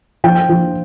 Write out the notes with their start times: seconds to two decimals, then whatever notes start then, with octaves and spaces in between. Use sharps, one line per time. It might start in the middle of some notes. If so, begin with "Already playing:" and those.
0.24 F3 G5
0.49 F3